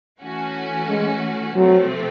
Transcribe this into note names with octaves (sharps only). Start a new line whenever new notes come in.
E3 A3 C#4 F#4
G#3
C3 F3 F#3 A3 C4